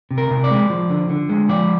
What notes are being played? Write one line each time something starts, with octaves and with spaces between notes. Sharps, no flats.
C3
A#4
C3
D5
G#3
F3
D3
D3
G#3
F3 D5